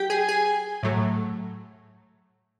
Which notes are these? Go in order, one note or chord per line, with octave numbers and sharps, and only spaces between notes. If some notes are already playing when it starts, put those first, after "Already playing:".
Already playing: F#3 G4 G5
G#4 G#5
G#4 G#5
A2 F#3 A3